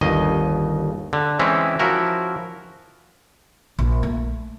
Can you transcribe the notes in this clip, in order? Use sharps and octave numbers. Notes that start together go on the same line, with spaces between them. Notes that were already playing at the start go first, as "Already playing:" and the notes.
G1 D#2 D#5
D3
E3 G#3 C4 C#4 E4
F3 C#4 E4 F#4 A#4
A#1
A3